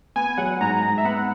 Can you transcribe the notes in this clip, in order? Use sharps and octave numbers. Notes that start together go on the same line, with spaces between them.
B3 G#5
F#3 F#5
G#2 A#5
G#2 A#5
E5
B3 F#5